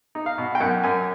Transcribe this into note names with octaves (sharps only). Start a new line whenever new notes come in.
D#4
F5
B2
G5
F#2 F#5
F#2 G#5